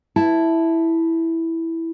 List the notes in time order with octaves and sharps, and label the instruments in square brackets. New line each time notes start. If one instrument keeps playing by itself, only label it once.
[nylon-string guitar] E4 A5